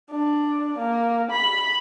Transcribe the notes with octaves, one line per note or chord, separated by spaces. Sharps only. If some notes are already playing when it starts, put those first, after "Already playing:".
D4
A#3
B5